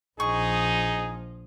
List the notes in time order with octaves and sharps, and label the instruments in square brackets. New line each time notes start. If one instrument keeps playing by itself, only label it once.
[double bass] A#1 F3 [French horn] D#4 [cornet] G#4 [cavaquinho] C#6